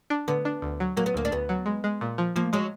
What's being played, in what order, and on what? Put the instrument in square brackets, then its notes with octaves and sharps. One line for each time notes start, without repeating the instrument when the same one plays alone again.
[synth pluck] D4
[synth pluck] D3 [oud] B3
[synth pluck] D4
D2
F#3
[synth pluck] F#3 [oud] A#3
[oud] B3
[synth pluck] D2 [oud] A#3
[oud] D4
[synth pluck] D2 [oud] B3
[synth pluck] F#3
G#3
G#3
A#2
F3
[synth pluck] F3 [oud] A#3
[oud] F#3 [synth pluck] G#3